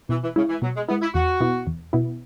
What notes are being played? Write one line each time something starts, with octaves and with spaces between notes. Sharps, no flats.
B2 E3
E3
C#3 G#3 E4
E3
B2 F#3
G#3
G#3 B3 E4
E4
E2 F#4
B2 B3 E4
E2
B2 B3 E4